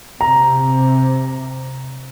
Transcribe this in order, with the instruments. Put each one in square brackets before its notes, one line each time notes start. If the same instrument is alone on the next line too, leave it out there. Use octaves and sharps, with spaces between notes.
[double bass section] C3 [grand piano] A#5